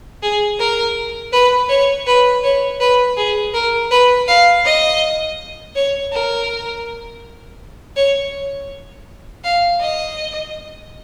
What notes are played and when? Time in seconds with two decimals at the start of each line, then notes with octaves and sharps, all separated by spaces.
0.23 G#4
0.60 A#4
1.33 B4
1.69 C#5
2.07 B4
2.44 C#5
2.80 B4
3.17 G#4
3.54 A#4
3.91 B4
4.28 F5
4.65 D#5
5.76 C#5
6.12 A#4
7.96 C#5
9.44 F5
9.80 D#5